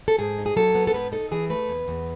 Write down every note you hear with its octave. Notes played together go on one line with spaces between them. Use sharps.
A4
G#2 G#4
D#4
G#4
F#3 A4
B3
A4
G#2 B4
D#4 A4
E3 G#4
A3 B4
E2
E2